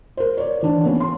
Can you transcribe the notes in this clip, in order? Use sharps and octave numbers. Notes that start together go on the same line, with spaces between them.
A#4 C5
C#5 D5
E3 D4
A#3 B3 C#4
C6